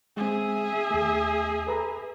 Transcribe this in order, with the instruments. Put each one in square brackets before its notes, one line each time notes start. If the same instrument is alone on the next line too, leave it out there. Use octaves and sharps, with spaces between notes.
[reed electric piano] G#3 C4 [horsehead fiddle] G#4 E5
[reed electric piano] D#2 A3
A4 B4 A#5